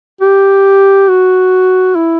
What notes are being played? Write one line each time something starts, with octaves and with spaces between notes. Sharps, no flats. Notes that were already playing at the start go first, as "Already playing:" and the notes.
G4
F#4
E4